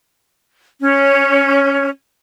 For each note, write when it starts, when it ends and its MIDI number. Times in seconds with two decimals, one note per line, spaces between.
0.81 1.88 61
0.81 1.88 73